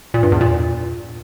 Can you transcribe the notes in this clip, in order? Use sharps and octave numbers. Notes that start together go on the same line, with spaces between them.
A#2
G2
E2
A#2